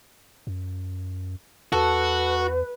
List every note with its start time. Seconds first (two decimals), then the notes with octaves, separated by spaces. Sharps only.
0.47 F#2
1.72 E2 F#4 A4 B4